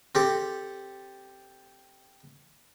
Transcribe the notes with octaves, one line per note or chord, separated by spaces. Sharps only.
C4 G4 A4